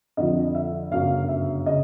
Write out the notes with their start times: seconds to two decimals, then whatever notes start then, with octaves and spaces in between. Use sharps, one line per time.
0.17 F2 D3 F3 D#5
0.55 E5
0.91 G1 F#2 C#3 F5
1.29 E5
1.66 C#3 D#5